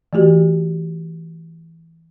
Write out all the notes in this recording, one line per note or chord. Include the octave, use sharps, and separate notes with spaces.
E3 A3 F#4 G4